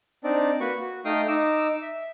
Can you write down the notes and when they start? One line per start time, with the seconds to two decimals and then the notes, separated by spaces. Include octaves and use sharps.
0.24 C4 D4 D#4 D5
0.60 A#3 F#4 B4 C#6
0.81 F#4
1.05 A3 D#4 F5 G5 D#6
1.28 D#4 D6 E6
1.82 E5